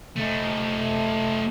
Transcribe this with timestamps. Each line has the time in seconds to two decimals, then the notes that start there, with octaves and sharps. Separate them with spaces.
0.16 A3 D#4